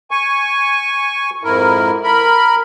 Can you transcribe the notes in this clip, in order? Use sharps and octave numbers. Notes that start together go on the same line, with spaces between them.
G#5 C#6
F2 G#2 E4 A#4
A#4 B5